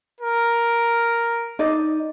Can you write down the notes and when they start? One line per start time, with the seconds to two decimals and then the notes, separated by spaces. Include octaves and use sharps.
0.21 A#4
1.59 D#4 D5 D#5